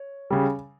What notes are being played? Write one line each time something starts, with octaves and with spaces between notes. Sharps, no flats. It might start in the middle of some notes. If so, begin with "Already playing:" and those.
Already playing: C#5
C#3 G3